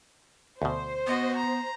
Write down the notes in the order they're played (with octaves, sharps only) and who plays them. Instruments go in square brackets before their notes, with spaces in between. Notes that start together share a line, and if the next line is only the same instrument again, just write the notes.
[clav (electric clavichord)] D2 B2 [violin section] C5
[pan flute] B3 [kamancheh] F#4 D#5
[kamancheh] A#5